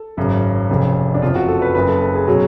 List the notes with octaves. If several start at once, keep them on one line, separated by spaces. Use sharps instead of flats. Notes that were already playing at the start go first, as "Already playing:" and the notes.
Already playing: A4
G#1 F#2 C#3
F1 F2 C#3
D4
F#1 F2 F3 F4
F#4
A4
B4
F#1 F#2 C#3 B4
A4
A4
G#4
B2 F#3 G#4